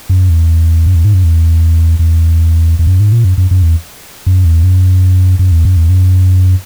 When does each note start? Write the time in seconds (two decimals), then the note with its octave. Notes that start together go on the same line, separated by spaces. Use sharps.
0.09 F#2
0.30 E2
0.86 F#2
0.95 E2
1.05 G#2
1.14 F#2
1.24 E2
1.99 E2
2.79 E2
2.87 F#2
3.00 G#2
3.12 A#2
3.24 F#2
3.38 F#2
3.51 F#2
3.62 E2
4.26 F#2
4.45 E2
4.63 F#2
5.39 F#2
5.52 E2
5.65 F#2
5.77 E2
5.89 F#2